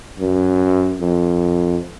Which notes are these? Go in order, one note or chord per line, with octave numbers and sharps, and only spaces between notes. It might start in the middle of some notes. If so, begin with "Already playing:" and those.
F#2
F2